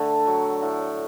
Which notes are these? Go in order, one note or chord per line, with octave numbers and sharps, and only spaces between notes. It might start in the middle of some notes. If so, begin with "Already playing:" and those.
Already playing: D3 A3
F#3
A2